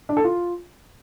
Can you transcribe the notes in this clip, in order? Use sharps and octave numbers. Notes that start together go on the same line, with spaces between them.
D4
A4
F4